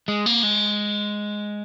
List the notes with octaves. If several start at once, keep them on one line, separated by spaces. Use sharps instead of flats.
G#3
A#3
G#3